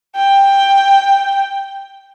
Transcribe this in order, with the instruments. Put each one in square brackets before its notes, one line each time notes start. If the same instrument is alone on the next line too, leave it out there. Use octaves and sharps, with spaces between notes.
[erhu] G5